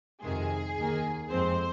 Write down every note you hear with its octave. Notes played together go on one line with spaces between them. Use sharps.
F2 C3 D#3 G#3 G#4
D#2 D#3 A#3
F2 F3 G#3 C4 C5